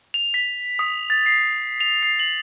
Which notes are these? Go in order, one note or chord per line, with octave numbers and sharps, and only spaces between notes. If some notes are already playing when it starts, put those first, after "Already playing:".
F7
B6
D#6
A6
C7
F7
C7
F#7